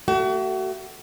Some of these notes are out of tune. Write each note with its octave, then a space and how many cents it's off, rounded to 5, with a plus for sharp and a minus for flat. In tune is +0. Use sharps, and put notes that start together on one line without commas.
A3 +25 F#4 +40